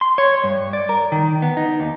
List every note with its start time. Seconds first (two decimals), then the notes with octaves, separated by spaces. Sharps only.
0.01 C6
0.18 C#5
0.44 G2
0.73 D5
0.89 A#4
1.12 D#3
1.42 B3
1.57 D#4
1.80 D#2